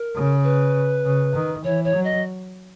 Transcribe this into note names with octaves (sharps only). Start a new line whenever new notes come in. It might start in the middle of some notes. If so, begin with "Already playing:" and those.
Already playing: A#4
C#3
B4
C#3
D#3
E3 C#5
C#5
F#3
D#5